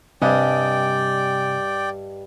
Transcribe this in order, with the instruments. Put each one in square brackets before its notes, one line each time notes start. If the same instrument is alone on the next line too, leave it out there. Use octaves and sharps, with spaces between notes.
[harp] G2 [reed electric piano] C3 G#5 [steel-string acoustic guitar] G3 D#5 [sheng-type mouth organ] D5 G5